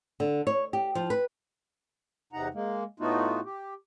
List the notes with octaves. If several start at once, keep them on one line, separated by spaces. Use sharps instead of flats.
D3
C#5
G4
F3
B4
E2 C3 D#4 F#5 A#5
G#3 A#3
A2 A3 B3 D#4 F4 F#4
G4